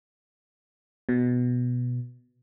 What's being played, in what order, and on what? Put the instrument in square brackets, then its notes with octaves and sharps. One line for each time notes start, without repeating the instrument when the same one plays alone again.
[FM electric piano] B2